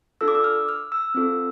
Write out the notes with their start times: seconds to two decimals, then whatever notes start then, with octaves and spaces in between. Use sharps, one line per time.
0.21 D4 F4 A4 E6
0.28 D6
0.35 E6
0.44 F6
0.69 F6
0.92 E6
1.15 C4 F4 A4